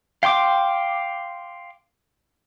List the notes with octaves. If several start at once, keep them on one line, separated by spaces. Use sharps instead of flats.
F5 G5 C6 D6